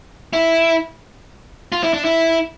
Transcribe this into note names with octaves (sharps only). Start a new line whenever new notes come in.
E4
F4
E4
D4
E4